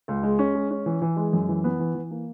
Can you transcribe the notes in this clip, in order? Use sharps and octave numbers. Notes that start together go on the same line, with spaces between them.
C#2
G#3
C#4
G#3
C#4
E3
E3
G#3
F#2
E3
B3
E3
E3
A#3